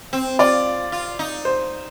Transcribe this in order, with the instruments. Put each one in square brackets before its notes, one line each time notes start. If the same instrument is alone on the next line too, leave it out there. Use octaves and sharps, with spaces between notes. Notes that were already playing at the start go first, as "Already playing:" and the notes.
[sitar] C4
[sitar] F4 [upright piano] D5
[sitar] F4
D#4
[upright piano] C5